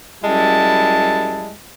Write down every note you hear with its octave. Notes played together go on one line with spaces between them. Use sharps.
F#2 G3 G#3 E4 A5